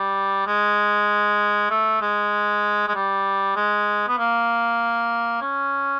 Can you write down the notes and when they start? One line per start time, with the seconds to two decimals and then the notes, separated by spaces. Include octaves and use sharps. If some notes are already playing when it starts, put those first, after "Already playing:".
Already playing: G3
0.47 G#3
1.70 A3
2.01 G#3
2.88 G#3
2.95 G3
3.56 G#3
4.08 B3
4.18 A#3
5.41 C#4